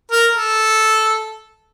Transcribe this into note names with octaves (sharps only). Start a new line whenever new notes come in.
A#4
A4